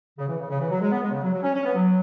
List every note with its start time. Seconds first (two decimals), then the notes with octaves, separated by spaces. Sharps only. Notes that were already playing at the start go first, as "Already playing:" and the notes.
0.18 C#3
0.28 E3
0.39 C#3
0.50 C#3
0.60 E3
0.70 F#3
0.81 G#3
0.91 B3
1.02 G#3
1.12 C#3
1.22 F#3
1.32 F#3
1.43 C#4
1.54 C#4
1.65 B3
1.75 F#3